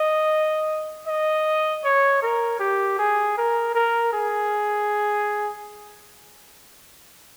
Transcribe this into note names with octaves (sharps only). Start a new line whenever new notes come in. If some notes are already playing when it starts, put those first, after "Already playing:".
Already playing: D#5
D#5
C#5
A#4
G4
G#4
A#4
A#4
G#4